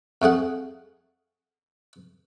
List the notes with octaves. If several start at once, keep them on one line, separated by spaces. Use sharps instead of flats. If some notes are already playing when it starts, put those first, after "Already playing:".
F2 A3 G#4 F#5